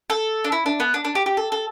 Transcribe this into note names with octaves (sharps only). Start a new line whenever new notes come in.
A4
D4
E4
D4
B3
D4
D4
G4
G4
A4
A4